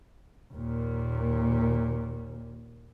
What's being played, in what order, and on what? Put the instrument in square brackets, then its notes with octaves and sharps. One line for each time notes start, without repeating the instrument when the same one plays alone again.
[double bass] D#2 A#2